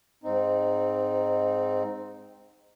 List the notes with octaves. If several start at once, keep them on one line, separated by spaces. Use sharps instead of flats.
G#2 C4 D#4